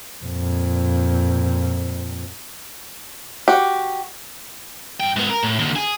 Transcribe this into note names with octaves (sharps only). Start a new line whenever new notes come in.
F2 A#2
F#4 G4
G2 G5
G#2 B3
A#4
A2
D#2 D3
G#4